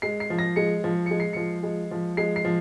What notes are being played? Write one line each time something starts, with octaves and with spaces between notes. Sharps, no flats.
G#3 C7
C7
F3
A#6
G#3 C#7
F3
G#3 C#7
C7
F3 C#7
G#3
F3
G#3 C7
C7
F3